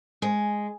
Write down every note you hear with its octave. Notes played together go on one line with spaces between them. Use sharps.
G#3